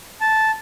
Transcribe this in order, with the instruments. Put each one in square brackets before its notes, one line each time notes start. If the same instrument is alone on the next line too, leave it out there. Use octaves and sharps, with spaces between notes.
[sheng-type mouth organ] A5